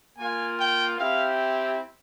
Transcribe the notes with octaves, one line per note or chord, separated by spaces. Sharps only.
A#3 F4 G#5
G5
C4 E4 G4 F5